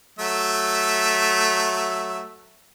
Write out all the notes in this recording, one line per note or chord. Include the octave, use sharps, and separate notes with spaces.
F#3 A3 E5